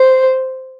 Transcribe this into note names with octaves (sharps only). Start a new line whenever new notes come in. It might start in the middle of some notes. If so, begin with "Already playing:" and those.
Already playing: C5